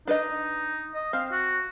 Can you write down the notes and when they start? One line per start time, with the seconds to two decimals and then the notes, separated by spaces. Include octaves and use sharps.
0.07 D4 D#4 B4 D#5
0.94 D#5
1.13 C4 F5
1.32 F#4